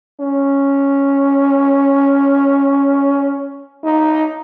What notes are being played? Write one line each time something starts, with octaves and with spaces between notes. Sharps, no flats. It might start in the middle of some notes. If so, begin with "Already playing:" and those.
C#4
D#4